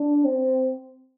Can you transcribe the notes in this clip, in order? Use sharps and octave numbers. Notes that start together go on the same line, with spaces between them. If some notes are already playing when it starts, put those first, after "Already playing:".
Already playing: D4
C4